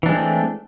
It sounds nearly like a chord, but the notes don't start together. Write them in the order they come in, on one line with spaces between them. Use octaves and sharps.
E3 D4 G#3 C4 A3